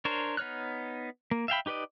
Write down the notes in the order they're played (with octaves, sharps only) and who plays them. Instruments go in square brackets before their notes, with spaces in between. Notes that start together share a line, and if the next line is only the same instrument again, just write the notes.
[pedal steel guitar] D4 A#4 C5 C#5
B3 D#4 C#5 F6 F#6
A#3
E5 F5 G5 B5
D#4 G4 B4 D5 D#5